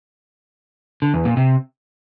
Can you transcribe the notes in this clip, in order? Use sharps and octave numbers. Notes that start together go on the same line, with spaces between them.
D3
E2
A#2
C3